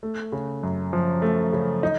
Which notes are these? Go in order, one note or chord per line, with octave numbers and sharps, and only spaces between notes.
A3
C#3
F#2
F3
A3
C#3
D#4